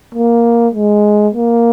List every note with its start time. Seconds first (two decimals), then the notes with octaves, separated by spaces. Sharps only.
0.15 A#3
0.75 G#3
1.35 A#3